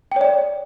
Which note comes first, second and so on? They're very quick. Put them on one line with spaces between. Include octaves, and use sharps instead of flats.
G5 C#5 D5